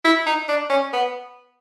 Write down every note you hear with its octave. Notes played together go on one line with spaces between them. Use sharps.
E4
D#4
D4
C#4
B3